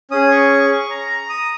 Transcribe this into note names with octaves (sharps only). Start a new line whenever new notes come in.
C#4 G#4 D#6
C#6
A#5
D#6